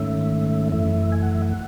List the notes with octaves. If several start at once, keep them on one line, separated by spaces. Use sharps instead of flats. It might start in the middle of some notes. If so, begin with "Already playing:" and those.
Already playing: G#2 D#3 A3 C#4 E5
F#2 E3 A3 E5
G#5
F#5
E5
F#5